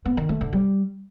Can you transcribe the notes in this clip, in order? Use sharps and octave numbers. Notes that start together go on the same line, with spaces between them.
B3
D#3
A3
D3
G3